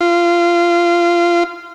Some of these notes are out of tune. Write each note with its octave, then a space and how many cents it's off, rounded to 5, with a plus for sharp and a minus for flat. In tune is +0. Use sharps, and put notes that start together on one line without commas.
F4 -20